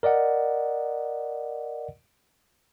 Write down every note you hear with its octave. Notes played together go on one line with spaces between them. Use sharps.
A#4 D5 D#5 F#5